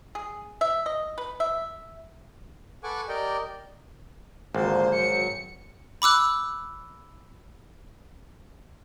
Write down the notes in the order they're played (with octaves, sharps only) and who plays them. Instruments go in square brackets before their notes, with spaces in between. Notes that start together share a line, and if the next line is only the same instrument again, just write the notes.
[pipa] G#4
E5
D#5
B4
E5
[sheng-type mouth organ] A4 B4 F#5 G#5 C#6 D6
G4 A#4 D5 D#5 G5
[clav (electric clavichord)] G#1 [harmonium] D3 F3 A#3 [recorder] C5
[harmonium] F#3 [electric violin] C#7
[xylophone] B5 D6 E6 F#6